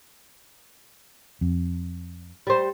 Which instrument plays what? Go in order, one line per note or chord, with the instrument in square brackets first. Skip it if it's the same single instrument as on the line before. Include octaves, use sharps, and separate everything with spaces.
[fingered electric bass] F2
[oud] G3 C5